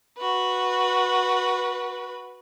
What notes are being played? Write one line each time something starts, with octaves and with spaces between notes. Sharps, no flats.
F#4 B4